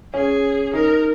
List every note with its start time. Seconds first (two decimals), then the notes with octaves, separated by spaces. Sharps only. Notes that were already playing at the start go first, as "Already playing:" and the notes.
0.14 C#4 G#4
0.74 D#4 A#4